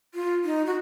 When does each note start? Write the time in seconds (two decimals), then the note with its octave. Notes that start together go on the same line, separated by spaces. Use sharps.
0.14 F4
0.44 D#4
0.66 F#4